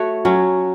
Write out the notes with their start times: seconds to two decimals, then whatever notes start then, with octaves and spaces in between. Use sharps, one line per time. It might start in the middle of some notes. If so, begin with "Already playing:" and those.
Already playing: A3 F#4 C#5
0.25 F#3 C#4